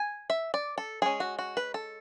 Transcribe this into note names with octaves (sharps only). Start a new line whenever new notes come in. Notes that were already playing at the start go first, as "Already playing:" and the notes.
Already playing: G#5
E5
D5
A4
G#3 C#4 G#4
F#4
F#4
B4
A4